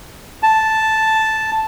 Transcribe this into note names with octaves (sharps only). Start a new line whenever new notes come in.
A5